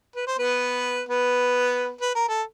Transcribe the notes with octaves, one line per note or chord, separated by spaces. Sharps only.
B4
C5
B3 B4
B3 B4
B4
A#4
A4